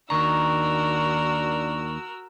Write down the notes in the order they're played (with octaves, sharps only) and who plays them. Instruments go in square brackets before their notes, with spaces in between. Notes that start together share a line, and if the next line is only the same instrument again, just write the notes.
[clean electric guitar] D#2 D#3 A#5 [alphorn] D4 [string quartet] F#4 A#4 E6 [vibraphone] C#6